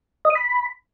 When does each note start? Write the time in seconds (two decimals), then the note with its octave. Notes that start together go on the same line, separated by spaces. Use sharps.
0.25 D#5
0.30 D#6
0.35 B5